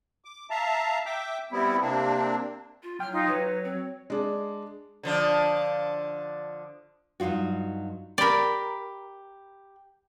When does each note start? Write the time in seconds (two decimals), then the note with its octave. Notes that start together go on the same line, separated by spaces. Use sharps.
0.25 D6
0.50 E5 F5 A5 A#5
1.06 E5 G5 D6
1.52 G3 B3 C4 E4
1.81 C3 A#3 C4 D4
2.83 F4
3.00 F#3 G5 F6
3.12 D#4 F4
3.28 F#3 B4 C#5
3.64 C4
4.10 G#3 D4
5.03 D3 F3 D4
7.20 G2 F#3 D#4 F4 F#4
8.18 G4 A#4 D5 B5